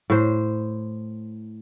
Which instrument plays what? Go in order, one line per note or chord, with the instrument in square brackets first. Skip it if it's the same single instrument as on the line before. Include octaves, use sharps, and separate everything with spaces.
[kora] A2 C5